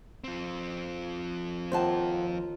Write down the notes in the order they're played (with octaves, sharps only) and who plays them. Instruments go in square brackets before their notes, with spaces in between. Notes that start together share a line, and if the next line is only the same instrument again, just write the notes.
[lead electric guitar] F3 C4
[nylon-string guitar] D#2 F4 A5 [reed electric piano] C5 F#5 G5